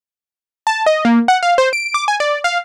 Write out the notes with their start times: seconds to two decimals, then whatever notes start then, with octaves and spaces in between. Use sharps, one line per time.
0.67 A5
0.86 D#5
1.05 A#3
1.28 F#5
1.43 F5
1.58 C5
1.73 D7
1.94 D6
2.08 G#5
2.20 D5
2.44 F5